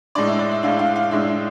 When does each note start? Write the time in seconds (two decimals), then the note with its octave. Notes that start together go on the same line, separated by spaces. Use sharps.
0.15 A2 G#3 D4 D5
0.28 E5
0.39 D5
0.51 E5
0.63 A2 G#3 D4 F5
0.79 F5
0.96 F5
1.11 A2 G#3 D4 E5
1.28 E5